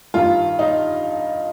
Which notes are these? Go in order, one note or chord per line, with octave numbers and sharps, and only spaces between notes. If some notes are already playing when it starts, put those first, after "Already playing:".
G2 D#3 F4
D#4